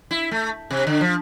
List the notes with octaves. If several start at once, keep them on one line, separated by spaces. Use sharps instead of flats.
E4
A3
C3
D3
F3